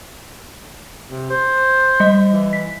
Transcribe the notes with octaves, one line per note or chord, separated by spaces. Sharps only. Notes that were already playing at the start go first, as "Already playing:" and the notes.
C3
C5
G3 D#5
E3
B6